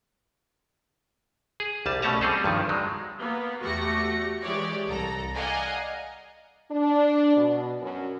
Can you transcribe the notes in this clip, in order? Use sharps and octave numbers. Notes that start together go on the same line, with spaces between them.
G#4
C2 G3 A5
B2 A3 C#4 A5 A#5
G3 C4 G#4 A4
G2 D#3 F3
F#3 G#3
A#3 B3
E2 A3 F#4 G4 A#6 C#7
E3 G#3 G4 C#5 D5
C2 A4 A#5
D5 D#5 F5 F#5 G#5 A#5
D4
B2
F#2